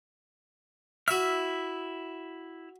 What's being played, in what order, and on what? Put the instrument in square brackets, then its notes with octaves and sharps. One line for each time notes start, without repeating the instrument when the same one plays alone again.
[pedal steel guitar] E4 E6 F6 [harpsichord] F#4 E5